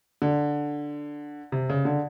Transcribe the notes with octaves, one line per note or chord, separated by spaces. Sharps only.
D3
C3
C#3
D3